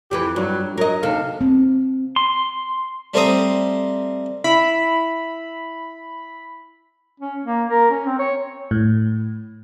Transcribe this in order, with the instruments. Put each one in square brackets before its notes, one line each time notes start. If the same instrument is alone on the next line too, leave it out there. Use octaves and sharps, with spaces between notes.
[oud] F2 E3 B4 [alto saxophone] G4
[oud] G2 [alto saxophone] F#3
[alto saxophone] F#3 [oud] A#4 D#5
[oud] D#2 C3 A4 [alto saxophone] F5
[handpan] C4
[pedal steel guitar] C6
[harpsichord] G3 A3 C4 C5 A#5 D#6
[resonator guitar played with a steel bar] E4 [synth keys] B5
[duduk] C#4
A#3
A#4
C#4
C4
C#5
[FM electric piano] A2